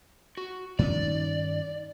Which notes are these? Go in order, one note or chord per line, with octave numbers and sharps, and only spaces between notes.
F#4
G2 D#3 C#4 D5